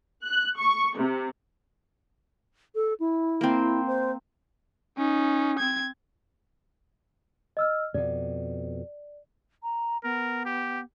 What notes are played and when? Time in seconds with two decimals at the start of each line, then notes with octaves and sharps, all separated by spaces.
0.23 F#6
0.56 C#6
0.95 C3
2.75 A4
3.00 E4
3.41 A#3 C4
3.87 C5
4.98 C#4 D#4
5.59 C4 G#6
7.57 D#5 E6 F6
7.94 F2 B2 D5
9.63 A#5
10.04 B3 A#4
10.46 G4